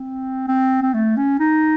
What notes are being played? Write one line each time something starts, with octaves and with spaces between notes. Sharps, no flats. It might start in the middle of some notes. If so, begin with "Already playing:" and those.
Already playing: C4
C4
C4
A3
C#4
D#4